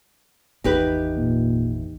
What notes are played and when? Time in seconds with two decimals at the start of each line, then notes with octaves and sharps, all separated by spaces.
0.64 G#1 E2 D#4 G4 B4
1.17 A#2